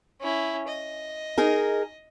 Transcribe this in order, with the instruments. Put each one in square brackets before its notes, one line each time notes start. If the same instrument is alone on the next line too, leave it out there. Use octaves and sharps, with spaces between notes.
[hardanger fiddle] C#4 E4
D#5
[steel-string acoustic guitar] D#4 G#4 A#4